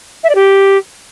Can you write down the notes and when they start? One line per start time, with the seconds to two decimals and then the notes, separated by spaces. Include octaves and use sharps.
0.23 E5
0.29 D5
0.35 G4